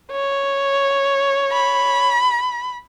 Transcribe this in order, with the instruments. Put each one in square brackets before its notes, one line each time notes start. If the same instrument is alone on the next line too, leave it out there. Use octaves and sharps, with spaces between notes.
[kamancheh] C#5
[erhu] B5